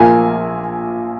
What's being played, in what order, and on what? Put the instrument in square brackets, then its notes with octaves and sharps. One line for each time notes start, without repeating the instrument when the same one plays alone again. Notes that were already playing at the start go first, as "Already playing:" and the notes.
Already playing: [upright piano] A#1 A#2 F3 A#3 F5 G#5